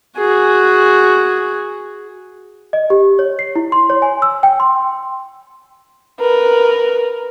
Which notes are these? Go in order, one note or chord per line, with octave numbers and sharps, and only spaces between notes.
F#4 G#4
D#5
G4
C#5
C7
E4
C6
C#5
G#5
E6
G5
C6
A#4 B4